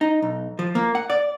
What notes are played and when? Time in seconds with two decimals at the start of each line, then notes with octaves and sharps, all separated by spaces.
0.01 D#4
0.22 B1
0.59 F3
0.75 A#3
0.95 F#5
1.10 D5